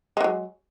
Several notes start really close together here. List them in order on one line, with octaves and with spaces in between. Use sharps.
G#3 E3 F#3